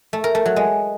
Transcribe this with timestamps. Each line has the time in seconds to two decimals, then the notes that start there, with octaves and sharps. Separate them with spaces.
0.13 A3
0.24 A#4
0.35 A3
0.46 F#3
0.56 G#3